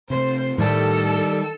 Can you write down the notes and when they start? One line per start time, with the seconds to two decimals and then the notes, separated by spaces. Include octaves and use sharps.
0.10 C3 A3 C5
0.58 A2 D#3 G3 A4 E6